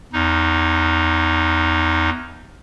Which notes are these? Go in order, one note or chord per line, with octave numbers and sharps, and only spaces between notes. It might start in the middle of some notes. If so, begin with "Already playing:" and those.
E2 D#4